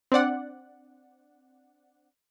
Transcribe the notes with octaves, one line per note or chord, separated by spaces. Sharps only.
C4 D4 D5 F#5